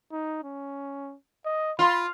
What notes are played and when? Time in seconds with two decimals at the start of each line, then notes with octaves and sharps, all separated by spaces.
0.12 D#4
0.44 C#4
1.45 D#5
1.79 F4 B5